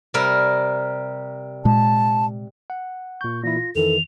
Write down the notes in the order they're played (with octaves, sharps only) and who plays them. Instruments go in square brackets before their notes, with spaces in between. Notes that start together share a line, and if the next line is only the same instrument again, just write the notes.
[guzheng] C3 G3 A#4
[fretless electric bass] A#2 G#3 [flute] A5
[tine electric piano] F#5
[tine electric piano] A#2 G6 [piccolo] C#6
[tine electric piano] A#2 E3 E4 [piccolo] A#6
[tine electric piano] F4
[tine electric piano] F2 D#3 E3 [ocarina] A4 [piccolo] F7